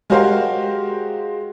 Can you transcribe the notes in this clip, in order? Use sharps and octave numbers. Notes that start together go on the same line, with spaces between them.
G#3 F#4 G4 A#4 C5 F5